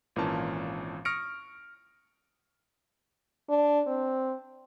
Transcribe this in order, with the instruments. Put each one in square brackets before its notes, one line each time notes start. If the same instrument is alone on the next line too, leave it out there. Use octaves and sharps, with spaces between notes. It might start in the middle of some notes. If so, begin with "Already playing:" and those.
[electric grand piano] G#1 A#2 E3 C#4 A#4 A5
C#6 D#6 F6 A#6 C#7 D7
[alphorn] D4
C4